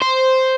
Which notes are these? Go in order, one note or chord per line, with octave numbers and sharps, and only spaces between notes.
C5